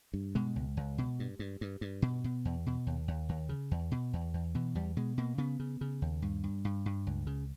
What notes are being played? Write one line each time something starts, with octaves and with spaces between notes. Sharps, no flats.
G2
B2 G#3
C#2
C#2
B2
G2
G2
G2
G2
B2
B2
E2
B2
D#2
D#2
D#2
C#3
E2
B2
E2
E2
B2 E3
E2 G3
B2 G#3
B2 A#3
C#3 B3
C#3
C#3
D#2
G2
G2
G2
G2
C#2
C#3